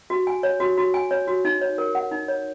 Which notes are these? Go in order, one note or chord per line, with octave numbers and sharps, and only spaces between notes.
F#4
G#5
C#5
F#4
F#4
G#5
C#5
F#4
D#4
C#5
A#4
F#5
D#4
C#5